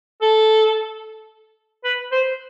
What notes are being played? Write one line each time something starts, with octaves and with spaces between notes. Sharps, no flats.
A4
B4
C5